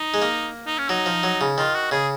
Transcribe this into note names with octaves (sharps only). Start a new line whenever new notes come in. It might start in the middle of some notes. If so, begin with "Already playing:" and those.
Already playing: D#4
G#3
A#3
D#4
C#4
F#3 D#4
F3
F#3
C#3
D#3 F4
F#4
C#3 G#4